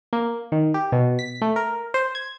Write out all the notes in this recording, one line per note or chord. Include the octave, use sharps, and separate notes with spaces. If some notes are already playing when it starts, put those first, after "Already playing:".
A#3
D#3
G4
B2
B6
A3
A#4
C5
G#6